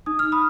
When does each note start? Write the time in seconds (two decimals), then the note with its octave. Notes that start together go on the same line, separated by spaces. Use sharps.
0.06 D#4 D#6
0.19 F6
0.32 B5 D#6